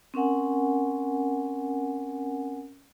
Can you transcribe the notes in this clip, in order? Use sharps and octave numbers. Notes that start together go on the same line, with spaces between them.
C4 C#4 A#4 F#5 G#5